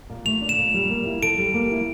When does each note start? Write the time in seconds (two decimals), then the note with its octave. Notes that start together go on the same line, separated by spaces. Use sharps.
0.10 A#2
0.25 A3 F7
0.41 D4
0.49 E7
0.58 A#2
0.74 G3
0.89 A#3
1.06 E4
1.22 A4 D7
1.38 G3
1.54 A#3
1.71 E4